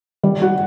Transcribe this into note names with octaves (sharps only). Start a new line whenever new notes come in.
G3
F#4